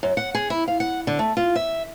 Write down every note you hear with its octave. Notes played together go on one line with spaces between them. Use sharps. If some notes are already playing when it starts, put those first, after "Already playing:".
F#2
F#5
G#4
E4
F5
F#5
D3
A3
F4
E5